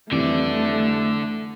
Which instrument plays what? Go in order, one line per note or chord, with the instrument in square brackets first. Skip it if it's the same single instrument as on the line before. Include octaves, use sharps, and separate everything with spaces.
[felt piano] F2 E3 G3 [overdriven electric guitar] D3 D5 [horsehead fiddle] A3